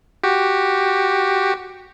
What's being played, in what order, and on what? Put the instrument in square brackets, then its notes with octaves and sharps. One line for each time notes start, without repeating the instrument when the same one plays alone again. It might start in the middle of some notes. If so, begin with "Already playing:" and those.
[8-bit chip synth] F#4 G4